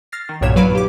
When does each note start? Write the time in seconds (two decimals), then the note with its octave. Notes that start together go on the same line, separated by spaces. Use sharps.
0.12 F6 A6 A#6 C7
0.29 D#3
0.41 B1 G2 A#2 C#5 G#6 E7
0.56 F#3 B4 F5 B5 D7
0.75 G4 D6